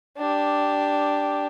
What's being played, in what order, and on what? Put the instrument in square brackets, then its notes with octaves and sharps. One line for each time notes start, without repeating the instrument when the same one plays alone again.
[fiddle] D4 G4